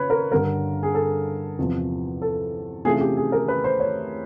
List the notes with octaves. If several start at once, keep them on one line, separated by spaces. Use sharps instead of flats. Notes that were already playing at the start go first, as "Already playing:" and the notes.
Already playing: F2 C#3 B4 C#5
A#4
G2 D3 G3 A#4
G#4
A4
E2 C3 F3
A4
C3 E3 A3 C#4 F4 G#4
G4
G#4
A#4
B4
C5
C#5